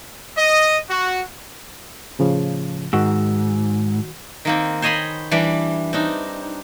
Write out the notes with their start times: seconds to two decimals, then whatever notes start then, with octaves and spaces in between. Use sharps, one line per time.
0.36 D#5
0.90 F#4
2.19 A2 C#3 F3
2.93 G#2 D#3 F#4 E6
4.45 D#3 A#3 C4
4.82 C5 C#5 D#5 G#5 B5 C6
5.31 E3 G3 D4 D5
5.93 C4 D4 D#4